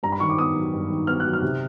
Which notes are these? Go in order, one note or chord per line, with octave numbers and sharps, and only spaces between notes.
G2 A#5
B5
D#3 C#6
D6
B3 D#6
F#3
G2
D#3
B3 F6
F#3 F#6
F6
C3